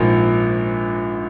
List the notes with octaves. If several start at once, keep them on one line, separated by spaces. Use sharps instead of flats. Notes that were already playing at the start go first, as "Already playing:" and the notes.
Already playing: A#1 G#2 F3 A#3